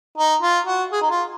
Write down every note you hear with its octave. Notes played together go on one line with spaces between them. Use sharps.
D#4
F4
F#4
G#4
D#4
F4